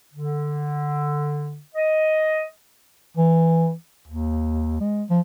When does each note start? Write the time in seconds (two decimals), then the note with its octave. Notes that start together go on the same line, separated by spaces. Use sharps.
0.14 D3
1.75 D#5
3.17 E3
4.07 D#2
4.80 G#3
5.10 F3